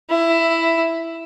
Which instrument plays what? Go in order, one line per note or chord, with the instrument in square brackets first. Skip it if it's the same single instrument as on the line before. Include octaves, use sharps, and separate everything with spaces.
[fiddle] E4